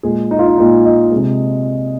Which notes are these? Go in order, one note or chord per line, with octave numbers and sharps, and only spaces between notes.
A#2 G#3 G#4
D#4
F4
D#4
A#2 G#3 D#4
D#5
C3 G#3